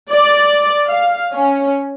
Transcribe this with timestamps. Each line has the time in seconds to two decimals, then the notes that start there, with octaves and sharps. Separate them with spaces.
0.11 D5
0.87 F5
1.34 C#4